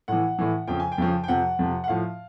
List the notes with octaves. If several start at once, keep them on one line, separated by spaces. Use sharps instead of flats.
A2 E3 F#5
A2 E3
F2 C#3 F3 G5
G#5
G5
F2 C#3 F3
G5
F2 C3 F3 F#5
F2 C3 F3
F#5
A2 F3 F5